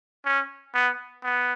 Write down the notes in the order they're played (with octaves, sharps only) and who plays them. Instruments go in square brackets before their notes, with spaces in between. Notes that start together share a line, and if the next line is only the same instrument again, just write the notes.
[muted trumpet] C#4
B3
B3